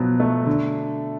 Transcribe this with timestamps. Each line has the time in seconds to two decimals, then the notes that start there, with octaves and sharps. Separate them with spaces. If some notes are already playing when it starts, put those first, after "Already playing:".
Already playing: B2 F3 F#3
0.20 A3
0.46 D3